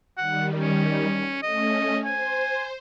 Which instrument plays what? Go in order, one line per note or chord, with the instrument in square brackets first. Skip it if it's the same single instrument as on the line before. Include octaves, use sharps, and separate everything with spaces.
[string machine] D#3 G3 [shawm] F#5
[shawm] C#4
[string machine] A3 C#4 [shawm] D#5
[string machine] C5 [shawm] G#5